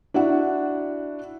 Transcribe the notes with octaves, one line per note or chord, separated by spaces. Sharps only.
D4 E4 F#4 F#5